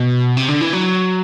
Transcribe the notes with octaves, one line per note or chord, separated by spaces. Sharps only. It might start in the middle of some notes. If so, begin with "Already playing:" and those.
Already playing: B2
C3
D3
E3
F#3